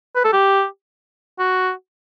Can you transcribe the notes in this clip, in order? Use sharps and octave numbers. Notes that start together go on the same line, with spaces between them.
B4
A4
G4
F#4